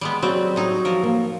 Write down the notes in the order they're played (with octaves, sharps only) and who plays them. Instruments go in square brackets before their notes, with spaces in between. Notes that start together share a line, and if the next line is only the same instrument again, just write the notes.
[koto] G3 G#3 B3
[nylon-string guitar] F#3 G3 F#4 [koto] C4
[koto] A2 D#4
F3 A#4
[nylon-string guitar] A#3